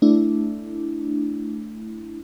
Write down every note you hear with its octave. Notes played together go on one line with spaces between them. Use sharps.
A3 D4 E4